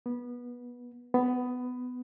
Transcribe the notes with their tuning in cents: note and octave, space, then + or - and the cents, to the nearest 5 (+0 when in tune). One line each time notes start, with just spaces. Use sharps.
B3 -20
B3 +15